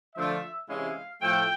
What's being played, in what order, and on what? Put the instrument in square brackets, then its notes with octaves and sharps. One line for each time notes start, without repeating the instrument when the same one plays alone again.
[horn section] D3 F3 A3 D4 F4 E5
C3 E3 G#3 C#4 E4 F5
A2 F3 A3 G5